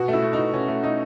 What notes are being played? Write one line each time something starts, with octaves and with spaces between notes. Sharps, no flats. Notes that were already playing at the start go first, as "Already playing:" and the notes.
Already playing: B2 F#4
A3 E4
A3
D#4
B2
B2 C#4
A3
A3 D#4